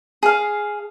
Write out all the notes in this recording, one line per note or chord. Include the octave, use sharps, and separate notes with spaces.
G#4 F5